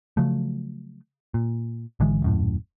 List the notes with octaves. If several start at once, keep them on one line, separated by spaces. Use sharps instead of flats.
C#3 F3 F#3 A3
A#2
G#1 D3 E3 G#3
D#1 F#2 A2